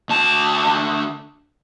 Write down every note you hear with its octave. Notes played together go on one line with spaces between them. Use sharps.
D2 A5